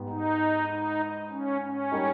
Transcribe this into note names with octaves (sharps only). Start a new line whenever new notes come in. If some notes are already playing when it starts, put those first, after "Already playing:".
Already playing: G#2 G3 B3
D#4
D#4
C#4
C#4
G3 A#3 D#4